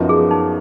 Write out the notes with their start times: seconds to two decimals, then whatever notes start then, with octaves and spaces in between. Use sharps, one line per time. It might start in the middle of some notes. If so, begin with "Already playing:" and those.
Already playing: F#2 F3 B3 D#4
0.09 G#4
0.31 D#4